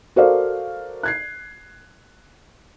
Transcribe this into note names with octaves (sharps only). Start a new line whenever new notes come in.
F#4 A4 A#4 C5 D5 F5
F#6 G#6 C7